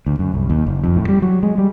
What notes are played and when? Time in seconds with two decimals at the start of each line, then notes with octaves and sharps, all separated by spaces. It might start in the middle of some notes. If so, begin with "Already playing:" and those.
0.06 D2
0.19 F#2
0.34 C2
0.50 D#2
0.66 F#1
0.84 F2
0.96 A2
1.09 G3
1.22 F#3
1.43 G#3
1.58 G3